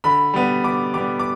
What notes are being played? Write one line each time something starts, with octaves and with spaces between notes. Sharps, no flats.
D3 B5
G3 B3
D3 D6
G3 B3 D6
D6